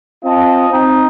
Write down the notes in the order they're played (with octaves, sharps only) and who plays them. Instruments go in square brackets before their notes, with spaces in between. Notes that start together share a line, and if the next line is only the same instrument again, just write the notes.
[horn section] C4 F4 D#5 A5
C4 D#4